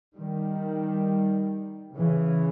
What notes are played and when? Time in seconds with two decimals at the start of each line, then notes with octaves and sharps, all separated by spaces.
0.15 D#3 G3
1.96 C#3 E3